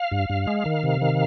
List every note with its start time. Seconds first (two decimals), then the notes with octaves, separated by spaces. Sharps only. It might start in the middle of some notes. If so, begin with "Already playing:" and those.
Already playing: F5
0.11 G2
0.30 G2
0.47 G#3
0.66 D#3
0.83 C3
1.02 D#3